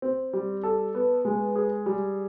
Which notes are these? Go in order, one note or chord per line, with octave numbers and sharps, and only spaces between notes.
C4
G3
A4
B3
G#3
G#4
G3